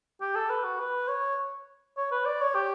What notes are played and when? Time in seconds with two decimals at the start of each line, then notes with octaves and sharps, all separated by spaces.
0.21 G4
0.35 A4
0.50 B4
0.64 F#4
0.80 B4
1.08 C#5
1.97 C#5
2.11 B4
2.25 D5
2.41 C#5
2.55 G4